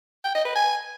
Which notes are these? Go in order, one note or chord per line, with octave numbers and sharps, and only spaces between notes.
G5
D#5
B4
G#5